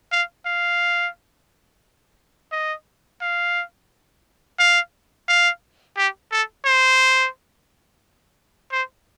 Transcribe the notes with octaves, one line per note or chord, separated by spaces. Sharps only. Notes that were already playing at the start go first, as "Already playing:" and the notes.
F5
F5
D#5
F5
F5
F5
G4
A4
C5
C5